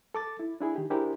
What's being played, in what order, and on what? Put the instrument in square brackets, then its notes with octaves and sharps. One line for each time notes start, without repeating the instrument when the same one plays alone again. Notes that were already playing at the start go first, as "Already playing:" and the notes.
[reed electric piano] A4 D6 A6
E4
D4 E4 G#4
D#3 G4
D4 E4 G4 G#4 A#4 C5